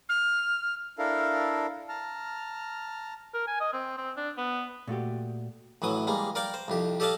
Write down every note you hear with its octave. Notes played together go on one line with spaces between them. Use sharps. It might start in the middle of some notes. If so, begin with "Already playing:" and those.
F6
D4 E4 A4 A#4 F5
A5 A#5 F6
A#4
G#5
D#5
C4
C4
D4
B3
A#2 A3 F#4 G4
A1 E3 F#3 D#6
G3 G#3 A#3
A#4 D5 F5 G5
C5
C2 F2 G4
G4 A4 D5 D#5 F5 A5